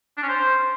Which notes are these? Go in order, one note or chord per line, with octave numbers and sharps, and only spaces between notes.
D4
C#4
C5